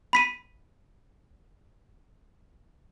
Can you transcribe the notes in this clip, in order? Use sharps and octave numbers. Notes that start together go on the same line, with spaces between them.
B5 B6 D#7